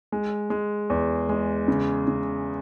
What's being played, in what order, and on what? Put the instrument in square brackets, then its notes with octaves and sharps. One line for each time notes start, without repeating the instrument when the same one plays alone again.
[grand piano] G#3
G#3
E2
G#3
C#3
C#3